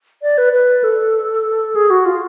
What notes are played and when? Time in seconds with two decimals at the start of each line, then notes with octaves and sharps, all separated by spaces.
0.22 D5
0.38 B4
0.53 B4
0.84 A4
1.75 G#4
1.90 F#4
2.06 F4